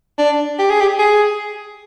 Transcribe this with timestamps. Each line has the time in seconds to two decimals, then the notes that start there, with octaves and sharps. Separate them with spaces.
0.18 D4
0.59 G4
0.70 G#4
0.80 G4
0.99 G#4